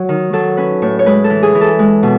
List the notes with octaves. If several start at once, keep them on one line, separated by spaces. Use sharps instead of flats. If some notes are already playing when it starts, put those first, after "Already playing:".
Already playing: F#3
D#3
F#3 A4
C#4 B4
A2 C#5
C#5
G#3 B4
A4
E3
G#4
E3
A4
G#3
B2